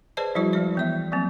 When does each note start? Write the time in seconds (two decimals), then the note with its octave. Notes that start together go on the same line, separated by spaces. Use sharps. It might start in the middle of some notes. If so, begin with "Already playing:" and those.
0.17 G#4 B4 C5 D5 D#5 A5
0.35 F3 G3 E4 F#4 C5
0.53 F3 G#3 D5
0.75 E3 B3 E5
1.12 F3 F#3 A#3 C4